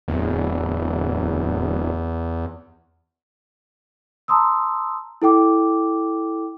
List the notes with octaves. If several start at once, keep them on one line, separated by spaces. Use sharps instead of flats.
D1 E2
A5 A#5 C6 D#6 E6
E4 A4 G5 D6